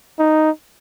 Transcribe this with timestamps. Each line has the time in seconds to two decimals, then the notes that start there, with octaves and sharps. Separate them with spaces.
0.19 D#4